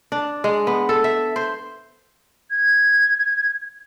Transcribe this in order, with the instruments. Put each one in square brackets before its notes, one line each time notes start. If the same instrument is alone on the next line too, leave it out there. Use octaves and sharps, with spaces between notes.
[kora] D4
G#3
B3
A4
E5
C5
[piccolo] G#6